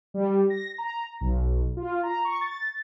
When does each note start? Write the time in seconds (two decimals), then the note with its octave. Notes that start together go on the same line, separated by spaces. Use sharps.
0.14 G3
0.50 A#6
0.78 A#5
1.21 B1
1.77 F4
2.03 A#5
2.25 C#6
2.41 A6